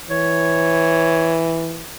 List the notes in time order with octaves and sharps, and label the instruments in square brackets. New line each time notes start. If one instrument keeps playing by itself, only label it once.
[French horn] E3 [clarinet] C#5